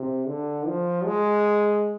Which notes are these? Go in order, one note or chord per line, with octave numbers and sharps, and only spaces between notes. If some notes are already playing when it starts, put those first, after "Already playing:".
Already playing: C3
D3
F3
G#3